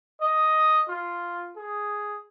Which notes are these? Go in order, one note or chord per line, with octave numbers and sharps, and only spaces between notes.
D#5
F4
G#4